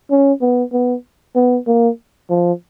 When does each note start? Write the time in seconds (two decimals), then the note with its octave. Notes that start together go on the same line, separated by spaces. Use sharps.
0.11 C#4
0.41 B3
0.73 B3
1.36 B3
1.67 A#3
2.30 F3